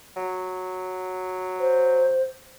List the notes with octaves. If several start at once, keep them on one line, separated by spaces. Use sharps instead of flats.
F#3
C5